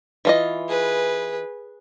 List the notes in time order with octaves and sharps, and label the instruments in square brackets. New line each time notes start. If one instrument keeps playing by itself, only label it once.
[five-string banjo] E3 F4 D#5
[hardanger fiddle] G#4 B4